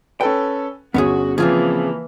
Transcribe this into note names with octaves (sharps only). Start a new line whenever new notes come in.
C#4 A4 B4 G5
G1 B3 C#4 F#4 G#4
C#3 E3 F3 A#3 C4 F4 G#4